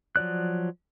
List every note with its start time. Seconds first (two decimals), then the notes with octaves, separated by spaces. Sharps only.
0.16 F3 F#3 D5 F#6